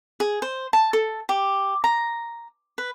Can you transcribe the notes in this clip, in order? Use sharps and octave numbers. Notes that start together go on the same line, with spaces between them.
G#4
C5
A5
A4
G4
A#5
B4